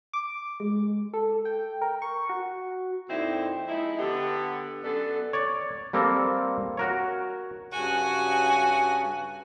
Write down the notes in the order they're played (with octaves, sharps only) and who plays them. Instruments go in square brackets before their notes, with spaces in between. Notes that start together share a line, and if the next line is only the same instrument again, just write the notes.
[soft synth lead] D6
G#3
A4
G5
A#4
C#6
F#4
[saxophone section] F2 A#2 D3 C4 D#4 E4
F3 G#3 D#4 E4
D3 B3 G4
F#2 B3 D4 A4
[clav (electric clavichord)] C#5 D5
G3 A#3 C4 A4
F#4 A#4 C#5
[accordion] G2 C#3 [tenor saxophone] F#4 [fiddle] G#5